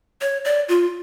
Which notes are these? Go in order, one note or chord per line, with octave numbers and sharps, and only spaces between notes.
C#5
D5
F4